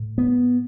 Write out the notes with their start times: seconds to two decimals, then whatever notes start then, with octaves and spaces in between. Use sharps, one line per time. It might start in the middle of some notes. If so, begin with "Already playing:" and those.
Already playing: A2
0.18 B3